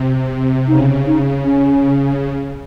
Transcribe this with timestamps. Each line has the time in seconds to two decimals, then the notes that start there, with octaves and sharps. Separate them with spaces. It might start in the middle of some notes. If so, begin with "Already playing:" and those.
Already playing: C3
0.68 C#3 D#4
1.06 D#4
1.45 C#4